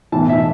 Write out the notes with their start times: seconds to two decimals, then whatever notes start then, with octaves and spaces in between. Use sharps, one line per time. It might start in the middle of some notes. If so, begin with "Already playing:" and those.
0.12 B1 A2 E3 A5
0.29 E5